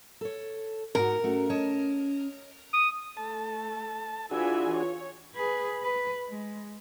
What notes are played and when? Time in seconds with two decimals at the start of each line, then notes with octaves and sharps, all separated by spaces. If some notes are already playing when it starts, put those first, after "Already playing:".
0.21 A4 C#5
0.95 G#2 F#4 A#4
1.24 A3 C#4 F#4
1.50 C#5 D#5 A5
2.73 D#6
3.17 A3 A5
4.31 E3 D4 F4 F#4 G#4 E5 G#5
4.74 C#5
5.35 G#4 B4
5.82 B4
6.29 G#3